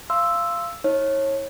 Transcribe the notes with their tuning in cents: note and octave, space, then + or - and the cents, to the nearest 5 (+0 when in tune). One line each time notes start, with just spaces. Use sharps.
F5 -20 C6 +0 E6 +0
D#4 +40 C#5 -25